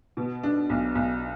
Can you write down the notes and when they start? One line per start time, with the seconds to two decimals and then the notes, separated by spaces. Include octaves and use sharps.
0.17 B2
0.43 D4
0.70 B1
0.95 B1